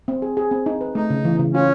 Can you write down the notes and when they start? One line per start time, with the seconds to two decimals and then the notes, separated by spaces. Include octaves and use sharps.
0.08 C4
0.22 G#4
0.37 G#4
0.51 C4
0.66 D#4
0.81 B4
0.95 A3 D#4
1.10 C#3
1.25 E3
1.39 C#3
1.54 C#4 F4